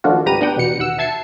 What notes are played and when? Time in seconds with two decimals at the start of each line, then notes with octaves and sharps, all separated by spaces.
0.04 D#3 F3 A3 D4 F4 F#4
0.26 G#1 C#2 G4 B4 A#5 D#7
0.41 B3 D4 F#5 G5
0.56 E2 B2 C#7
0.79 D#2 F#5 E6
0.98 E5 A5 G#6 C7 C#7